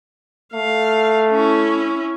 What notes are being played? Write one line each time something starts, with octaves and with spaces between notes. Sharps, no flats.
A3 F5
C#4 E4